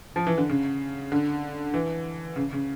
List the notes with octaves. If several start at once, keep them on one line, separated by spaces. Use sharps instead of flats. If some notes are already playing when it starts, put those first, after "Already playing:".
F3
E3
D3
C#3
D3
E3
C#3
C#3